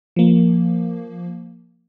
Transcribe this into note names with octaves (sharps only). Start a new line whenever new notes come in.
F3 A#3